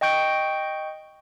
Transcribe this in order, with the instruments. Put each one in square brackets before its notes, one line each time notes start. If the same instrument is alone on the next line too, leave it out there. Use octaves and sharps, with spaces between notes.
[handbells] D#5 G5 C#6 G6 D7